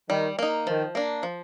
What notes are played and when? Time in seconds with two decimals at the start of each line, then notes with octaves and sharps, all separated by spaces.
0.10 D#3 G3
0.39 A#3 D#4
0.66 D#3 F3
0.95 A#3 D4
1.23 F3